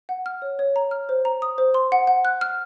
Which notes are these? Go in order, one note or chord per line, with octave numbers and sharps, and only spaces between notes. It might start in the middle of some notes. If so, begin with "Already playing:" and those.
F#5
F6
C#5
C#5
A#5
F6
C5
A#5
D#6
C5
C6
F#5
F#5
F#6
F6